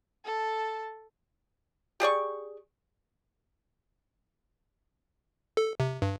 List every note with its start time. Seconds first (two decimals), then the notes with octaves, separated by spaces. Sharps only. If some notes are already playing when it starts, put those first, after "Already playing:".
0.25 A4 A5
2.00 G4 G#4 D5 C#6
5.57 A4
5.80 C3
6.02 G2